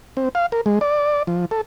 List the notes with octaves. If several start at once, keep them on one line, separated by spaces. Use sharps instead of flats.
C4
F5
A#4
G#3
D5
F3
A4